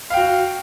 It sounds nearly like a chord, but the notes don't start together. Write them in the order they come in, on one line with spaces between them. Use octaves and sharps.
F5 G5 F#4